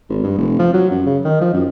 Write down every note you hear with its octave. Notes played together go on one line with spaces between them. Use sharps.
G#1
G2
F1
F3
F#3
F#2
C#3
D#3
F3
F#2